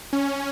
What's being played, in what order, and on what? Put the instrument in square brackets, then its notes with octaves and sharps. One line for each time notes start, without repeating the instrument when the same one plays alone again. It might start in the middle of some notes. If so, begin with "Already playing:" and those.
[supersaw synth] C#4